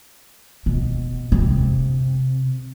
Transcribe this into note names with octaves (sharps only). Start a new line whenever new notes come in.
B2
C3